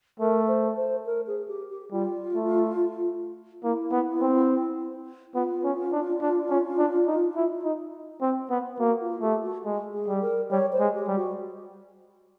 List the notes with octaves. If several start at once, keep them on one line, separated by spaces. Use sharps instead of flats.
A3 A#4
C5
C5
A#4
G#4
G4
G4
G3 F4
A3
A#3 E4
B3
C4
B3 F4
C#4
D4
D4
C#4
D4
D#4
E4
D#4
C4
B3
A#3 F#4
F4
A3 G4
F#4
G#3
G#4
G3
A#4
G3 C#5
C5
G#3
G4
G3
F#4